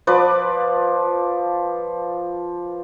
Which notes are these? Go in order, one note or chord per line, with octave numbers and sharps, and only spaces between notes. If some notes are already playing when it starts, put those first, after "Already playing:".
F3 B4 D5